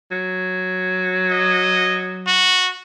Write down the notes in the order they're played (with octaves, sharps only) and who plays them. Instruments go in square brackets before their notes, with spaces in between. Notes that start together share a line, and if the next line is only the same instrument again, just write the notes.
[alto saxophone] F#3
[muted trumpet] D#5
F#4